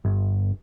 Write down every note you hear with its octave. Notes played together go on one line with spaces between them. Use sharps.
G1